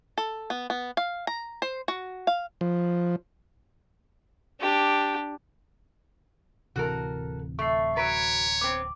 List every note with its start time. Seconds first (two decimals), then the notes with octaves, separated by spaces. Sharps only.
0.18 A4
0.50 B3
0.70 B3
0.97 F5
1.27 A#5
1.62 C5
1.88 F#4
2.27 F5
2.61 F3
4.60 D4 G4
6.76 D1 C3 E3 F#4 A4 A#4
7.59 A3 C#6 A6 C7
7.97 F#3 B4 C#5 A#5 B6 D7
8.61 B3 C4 D6